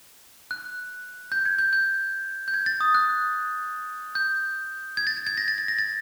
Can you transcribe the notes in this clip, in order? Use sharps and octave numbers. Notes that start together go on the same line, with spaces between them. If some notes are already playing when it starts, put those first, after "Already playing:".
F#6
G6
G#6
G6
G6
G6
G#6
A6
D#6
F#6
G6
G#6
A6
A6
G#6
A#6
A6
A6
A#6
A6